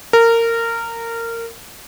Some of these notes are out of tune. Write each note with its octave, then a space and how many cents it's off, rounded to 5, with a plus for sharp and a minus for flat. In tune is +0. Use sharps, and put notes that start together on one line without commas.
A#4 -20